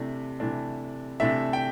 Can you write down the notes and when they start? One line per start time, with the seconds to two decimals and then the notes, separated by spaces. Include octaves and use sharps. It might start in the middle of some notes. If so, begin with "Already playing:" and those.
Already playing: C3 E3 A3 D4
0.40 C3 E3 A3 D4
1.20 C3 E3 A3 D4 E5
1.53 G5